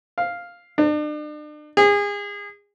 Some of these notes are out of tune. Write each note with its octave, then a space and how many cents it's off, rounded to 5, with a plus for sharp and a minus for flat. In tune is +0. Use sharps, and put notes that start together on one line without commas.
F5 +0
D4 +40
G#4 -30